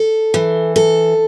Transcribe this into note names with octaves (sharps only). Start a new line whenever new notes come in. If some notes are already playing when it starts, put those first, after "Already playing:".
Already playing: A4
E3
A4